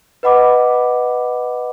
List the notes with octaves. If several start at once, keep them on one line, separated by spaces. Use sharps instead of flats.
B4 D#5 F#5 B5 D6